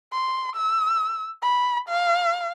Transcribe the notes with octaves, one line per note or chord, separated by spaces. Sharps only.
C6
E6
B5
F5